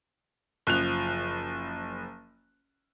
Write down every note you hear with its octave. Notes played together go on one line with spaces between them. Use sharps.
F#1 F3 F#6 F7